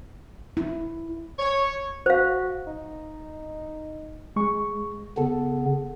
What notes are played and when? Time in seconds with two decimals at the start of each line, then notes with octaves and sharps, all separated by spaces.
0.57 E4
1.39 C#5
2.06 F#4 C5 F5
2.67 D#4
4.36 G#3 G#4 C#6
5.18 C#3 B3 A4